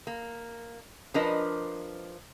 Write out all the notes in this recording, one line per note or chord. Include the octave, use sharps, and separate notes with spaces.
A#3
F3 D4 A#4 B4 D#5